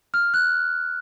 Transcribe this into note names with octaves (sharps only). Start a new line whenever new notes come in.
F6
F#6